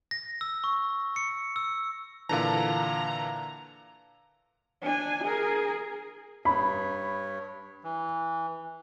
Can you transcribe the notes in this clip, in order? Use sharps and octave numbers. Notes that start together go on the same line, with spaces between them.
A#6
E6
C#6
C#7
E6
A#2 D3 E3 F5 A5 A#5
D4 G#5
G#4 A#4
G2 C#5 B5
E3